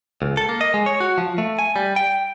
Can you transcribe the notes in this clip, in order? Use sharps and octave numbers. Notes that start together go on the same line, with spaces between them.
C#2
A4
A#3
D#5
G#3
C#5
F#4
F3
A3
G#5
G3
G5